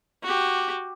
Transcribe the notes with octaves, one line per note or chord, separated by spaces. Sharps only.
F#4 G4